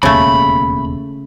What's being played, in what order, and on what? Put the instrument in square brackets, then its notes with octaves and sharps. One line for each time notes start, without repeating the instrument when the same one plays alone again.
[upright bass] E1 D#2 [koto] C#3 A3 [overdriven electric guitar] B5